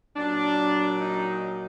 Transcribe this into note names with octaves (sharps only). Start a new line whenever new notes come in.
A#2 F#3 D4
D#4